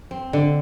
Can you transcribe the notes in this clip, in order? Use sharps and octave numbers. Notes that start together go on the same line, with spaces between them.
C4
D3